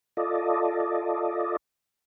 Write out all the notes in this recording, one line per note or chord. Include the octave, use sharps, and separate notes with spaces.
F4 A4 D5 D#5